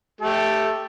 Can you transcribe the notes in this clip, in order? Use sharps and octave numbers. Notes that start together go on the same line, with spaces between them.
A3 G4 A4